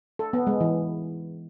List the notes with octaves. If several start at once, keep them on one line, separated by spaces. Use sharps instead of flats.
A4
B3
G#3
E3